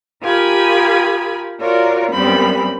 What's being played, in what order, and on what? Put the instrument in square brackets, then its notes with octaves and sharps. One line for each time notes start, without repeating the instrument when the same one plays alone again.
[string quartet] F4 G4 A#4 G#5 B5 D#6
F4 F#4 A#4 C#5 D5
F#2 A#2 G3 B3 C4 B5